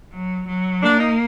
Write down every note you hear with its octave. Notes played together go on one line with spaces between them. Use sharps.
F#3
F#3
A#3 D4
D#4